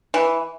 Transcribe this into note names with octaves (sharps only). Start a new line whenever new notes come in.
E3